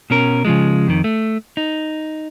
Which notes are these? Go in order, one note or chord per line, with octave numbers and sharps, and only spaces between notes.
B2 C#4 A#4
C#3 F3 G#3
F2 D#3
A3
D#4